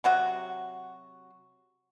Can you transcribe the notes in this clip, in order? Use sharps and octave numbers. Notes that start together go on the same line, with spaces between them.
C3 F#3 F#4